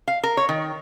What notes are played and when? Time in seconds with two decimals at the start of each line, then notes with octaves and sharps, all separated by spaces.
0.08 F5
0.23 A#4
0.37 C#5
0.49 D#3